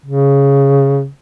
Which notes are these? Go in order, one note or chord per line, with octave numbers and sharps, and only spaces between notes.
C#3